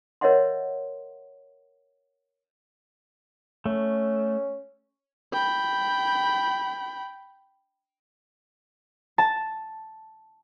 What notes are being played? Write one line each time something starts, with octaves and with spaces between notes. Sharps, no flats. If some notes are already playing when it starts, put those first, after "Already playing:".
A#4 C#5 D#5 E5 F#5 C6
A3 C#4
G5 B5
A5